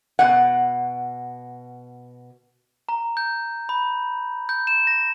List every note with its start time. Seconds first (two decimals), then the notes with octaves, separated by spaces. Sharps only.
0.19 B2 F#5
2.89 A#5
3.17 G6
3.69 B5
4.49 G6
4.67 E7
4.87 A#6